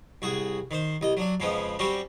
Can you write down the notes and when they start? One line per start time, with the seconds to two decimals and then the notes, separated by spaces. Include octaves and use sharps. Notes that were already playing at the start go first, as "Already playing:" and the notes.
0.22 C2 F#4 G#4
0.71 D#3 C5
1.01 C2 D#5
1.17 F#3 D4
1.40 F2 C#3 F3 G#3 B3
1.79 G3 C4 C#4 F#4 G4